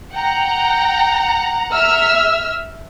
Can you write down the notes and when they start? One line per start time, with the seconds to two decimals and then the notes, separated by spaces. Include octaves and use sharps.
0.14 F#5 G5 A#5
1.74 E5 E6 F6